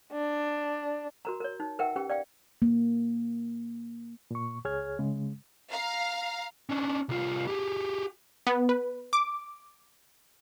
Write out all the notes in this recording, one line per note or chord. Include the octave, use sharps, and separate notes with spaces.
D4
F#4 A#4 A#5
A#4 C#5
D#4
A#4 B4 E5 F#5 G5
C#4 G4 B4 G5
D5 F5 G5
A#3
A#2 C#6
C#2 G#4 C#5 F6 G#6
C#3 G#3
F5 A#5
C#4 D4
C2 F4
G4 G#4
B3
B4
D6